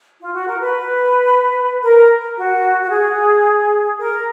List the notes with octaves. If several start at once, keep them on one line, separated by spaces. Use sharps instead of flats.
F4
F#4
A#4
B4
A#4
F#4
F#4
G#4
A#4